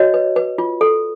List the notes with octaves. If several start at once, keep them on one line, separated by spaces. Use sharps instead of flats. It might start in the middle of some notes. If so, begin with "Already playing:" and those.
Already playing: F#4 C#5 D#5
B4
B4
F4
A4